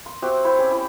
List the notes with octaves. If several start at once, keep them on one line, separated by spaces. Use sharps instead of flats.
C6
C4 F#4 G4 E5
E4 C5 G5
C#4 G4
E4